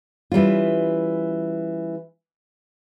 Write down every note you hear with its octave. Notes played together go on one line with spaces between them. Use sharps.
E3 G3 C#4 F4